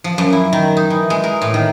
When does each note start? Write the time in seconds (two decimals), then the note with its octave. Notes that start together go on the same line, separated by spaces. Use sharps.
0.04 F3
0.18 F#2
0.32 E4
0.53 D#3
0.77 D#4
0.90 E3
1.10 G#3
1.24 A#4
1.42 A2
1.54 D#3